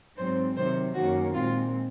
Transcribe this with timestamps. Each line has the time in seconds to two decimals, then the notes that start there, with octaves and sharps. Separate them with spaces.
0.17 G#2 F#3 C4 C5
0.55 C3 D#3 F#3 C5
0.94 F#2 D#3 A#3 C#4 F#4
1.33 A#2 G#3 C4 F4